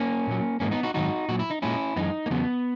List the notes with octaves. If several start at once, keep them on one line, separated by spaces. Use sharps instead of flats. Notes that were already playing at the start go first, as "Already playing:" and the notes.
Already playing: A#3 C#4
A#2 F#3
G#2 E3 G#3 A#3 C#4
B3 D#4
D#4 F#4
G#2 D#3 F#3 D#4 F#4
A#2 F#3 F#4
E4
D#4
A#2 G#3 C#4 E4
F#2 E3 G#3 B3 D#4
A#3
E2 C#3 F#3 B3